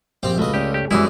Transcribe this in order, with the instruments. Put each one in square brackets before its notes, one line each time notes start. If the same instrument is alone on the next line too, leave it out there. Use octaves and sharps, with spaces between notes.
[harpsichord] A#1 C4 G4
[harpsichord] C#2 D#5 [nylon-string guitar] A3 F#4 B4
[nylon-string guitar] A3 C#4 D5 [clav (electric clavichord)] G4
[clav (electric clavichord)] G4
[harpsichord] F#2 G3 G#4 [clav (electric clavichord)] E3 E4 [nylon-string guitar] G#3 B3 F#4